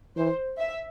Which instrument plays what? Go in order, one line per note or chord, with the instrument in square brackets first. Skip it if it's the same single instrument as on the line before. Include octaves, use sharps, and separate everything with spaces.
[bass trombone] E3 [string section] C5
[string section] E5